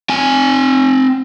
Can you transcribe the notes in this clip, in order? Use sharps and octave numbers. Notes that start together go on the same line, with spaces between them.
C4 G#5